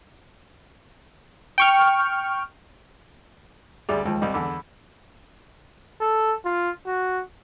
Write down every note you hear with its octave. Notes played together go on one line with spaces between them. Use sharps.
G5 C#6 F6
D2 G3 G#4 D5 E5
D#2 F3 G#3 G5
C2 G3 D#5
E2 D3 B5 E6
A4
F4
F#4